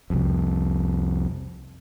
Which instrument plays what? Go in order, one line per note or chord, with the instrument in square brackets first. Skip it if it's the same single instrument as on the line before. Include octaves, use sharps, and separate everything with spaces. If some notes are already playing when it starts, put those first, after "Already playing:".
[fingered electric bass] C2 F2